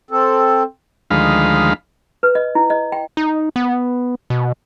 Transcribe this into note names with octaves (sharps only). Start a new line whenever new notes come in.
C4 A4
D2 D#3 F3 G#3 F5 B5
B4
D#5
E4
D#5
G5
D#4
B3
B2